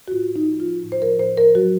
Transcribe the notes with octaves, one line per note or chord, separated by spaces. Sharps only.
F#4
A2 F4
A2
D#4
F3
F4
F3
A2
C5
F3 A#4
A2 C5
F3 A#4
F#3 F#4